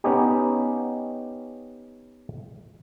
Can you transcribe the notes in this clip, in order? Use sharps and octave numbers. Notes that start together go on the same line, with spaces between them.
B3 C#4 D#4 G4